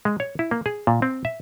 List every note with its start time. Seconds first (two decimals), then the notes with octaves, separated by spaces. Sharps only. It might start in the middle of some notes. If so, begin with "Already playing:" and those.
0.05 G#3
0.20 C#5
0.39 E4
0.51 A#3
0.66 G#4
0.87 A#2
1.02 C4
1.25 E5